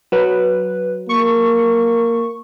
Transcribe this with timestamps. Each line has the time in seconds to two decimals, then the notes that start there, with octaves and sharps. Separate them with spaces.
0.12 F#3 B4
1.09 A#3 C#6